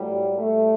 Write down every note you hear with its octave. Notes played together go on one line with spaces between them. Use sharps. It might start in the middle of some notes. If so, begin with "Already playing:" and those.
Already playing: A2 F#3 G3
A2 G3 A3